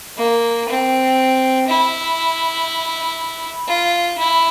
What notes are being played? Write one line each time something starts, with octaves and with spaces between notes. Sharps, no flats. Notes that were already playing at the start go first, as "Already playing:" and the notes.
A#3
C4
E4
F4
E4